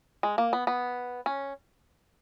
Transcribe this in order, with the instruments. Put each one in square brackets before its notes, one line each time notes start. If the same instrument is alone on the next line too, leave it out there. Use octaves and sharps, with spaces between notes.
[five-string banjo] G#3
A#3
B3
B3
C#4